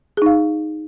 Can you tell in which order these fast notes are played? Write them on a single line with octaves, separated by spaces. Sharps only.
G#4 D#4 F5